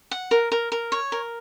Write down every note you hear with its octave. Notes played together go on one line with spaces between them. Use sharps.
F#5
A#4
A#4
A#4
C#5
A#4